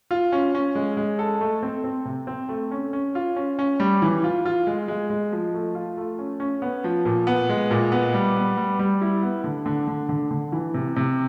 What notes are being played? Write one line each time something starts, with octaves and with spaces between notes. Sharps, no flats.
F4
C#4
C#4
G#3
G#3
A4
A3
C4
C4
C3
C4
A3
C#4
C#4
F4
C#4
C#4
G3
E3
F4
F4
G#3
G#3
G#3
F3
A3
F4
A3
C#4
C#4
B3
F3
A#2
B3
G#3
A#2
B3
G3
B3
G3
G3
E4
B3
D3
D3
D3
D3
D3
E3
C3
C3